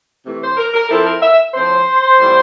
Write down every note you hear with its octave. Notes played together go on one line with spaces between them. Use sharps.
C3 E3 A3
C5
A#4
A#4
F3 C4 E4 A4
A#4
E5
A2 F3 C4 C5
A2 E3 G3 C4 F4